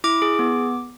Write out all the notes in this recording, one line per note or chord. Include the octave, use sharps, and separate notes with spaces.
E4 D6
G#4
B3